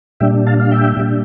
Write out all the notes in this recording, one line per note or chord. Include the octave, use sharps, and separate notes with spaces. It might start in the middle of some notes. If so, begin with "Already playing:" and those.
A#2 G3 D4 E5 G5
F5 A5
F5
E5 G5
A#2 G3 D4